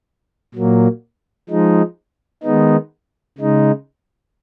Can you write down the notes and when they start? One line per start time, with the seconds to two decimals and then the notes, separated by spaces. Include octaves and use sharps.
0.54 A#2 F#3 A#3
1.49 F3 G#3 D#4
2.43 D#3 G#3 B3 D#4
3.38 C#3 G#3 D#4